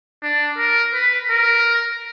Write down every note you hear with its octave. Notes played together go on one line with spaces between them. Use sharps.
D4
A#4
B4
A#4